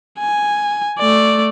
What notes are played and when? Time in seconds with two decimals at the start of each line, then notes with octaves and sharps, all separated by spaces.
0.19 G#5
0.99 A3 D5